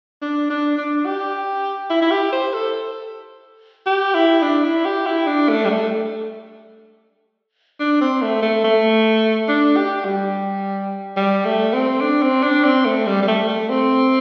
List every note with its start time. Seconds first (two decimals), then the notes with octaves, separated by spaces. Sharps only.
0.22 D4
0.50 D4
0.78 D4
1.06 G4
1.90 E4
2.02 E4
2.11 G4
2.32 C5
2.54 A4
3.86 G4
4.14 E4
4.42 D4
4.64 E4
4.85 G4
5.06 E4
5.27 D4
5.49 A3
5.65 G3
5.70 A3
7.80 D4
8.01 C4
8.22 A3
8.43 A3
8.64 A3
9.48 D4
9.76 G4
10.05 G3
11.17 G3
11.45 A3
11.73 C4
12.01 D4
12.22 C4
12.43 D4
12.64 C4
12.86 A3
13.07 G3
13.22 G3
13.28 A3
13.48 A3
13.70 C4